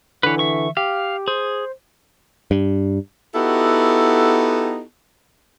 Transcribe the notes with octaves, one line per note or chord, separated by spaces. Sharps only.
D3 E3 B4 C#5
E5 C#6
G4 F5
G#4 C5
G2
B3 D#4 E4 F#4 G4 A4